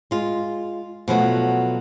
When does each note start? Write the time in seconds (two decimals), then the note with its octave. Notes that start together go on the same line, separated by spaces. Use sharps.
0.11 G#3 F4
1.08 B2 F3 F#3 A3